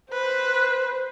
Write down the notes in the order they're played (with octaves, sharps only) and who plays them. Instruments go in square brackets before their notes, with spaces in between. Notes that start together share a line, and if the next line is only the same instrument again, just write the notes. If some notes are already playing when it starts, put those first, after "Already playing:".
[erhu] B4 [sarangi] C5